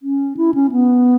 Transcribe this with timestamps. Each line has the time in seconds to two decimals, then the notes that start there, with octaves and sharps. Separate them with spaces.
0.02 C#4
0.37 E4
0.54 C#4
0.71 B3